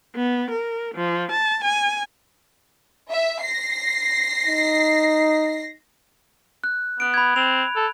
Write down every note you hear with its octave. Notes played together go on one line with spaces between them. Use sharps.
B3
A#4
F3
A5
G#5
E5
A#6 C7
D#4
F#6
B3 F#6 D7
B5 G#6
C4 F7
A4